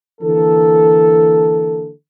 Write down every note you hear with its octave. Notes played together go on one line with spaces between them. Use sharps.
D3 E3 A#3 A4